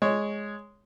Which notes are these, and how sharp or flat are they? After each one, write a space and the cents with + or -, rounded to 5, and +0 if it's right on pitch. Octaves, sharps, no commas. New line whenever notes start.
G#3 +0 C#5 +0